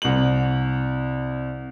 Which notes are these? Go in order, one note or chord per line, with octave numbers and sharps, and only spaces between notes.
C2 F#7